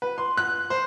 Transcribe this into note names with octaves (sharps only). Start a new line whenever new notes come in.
B4
C6
F#6
C5